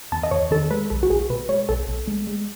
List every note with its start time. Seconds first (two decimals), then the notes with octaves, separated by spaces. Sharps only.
0.12 E2 A5
0.23 D#5
0.31 E2 C#5
0.51 D#3 A4
0.71 G#3 B4
0.90 B1 A4
1.03 F#4
1.10 B1 G#4
1.30 B2 B4
1.49 G#3 C#5
1.69 B1 A4
1.88 B1
2.07 G#3
2.27 G#3